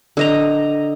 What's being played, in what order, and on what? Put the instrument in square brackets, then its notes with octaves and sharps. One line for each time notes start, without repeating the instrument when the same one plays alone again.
[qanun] D3 D#5 A#5